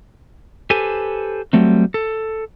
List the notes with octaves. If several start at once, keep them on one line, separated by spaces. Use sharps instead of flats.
G4 A4 B4 C5 G#5
F#3 G3 A3 C4
A4